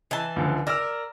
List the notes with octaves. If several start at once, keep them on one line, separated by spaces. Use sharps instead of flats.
E3 A5
C#2 D3 F3
A#4 D5 E6 F6